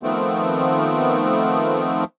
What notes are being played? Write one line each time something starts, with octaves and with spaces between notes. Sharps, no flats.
D#3 F3 A3 B3 C4